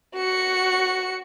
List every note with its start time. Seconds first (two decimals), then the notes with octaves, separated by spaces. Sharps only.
0.16 F#4 C#7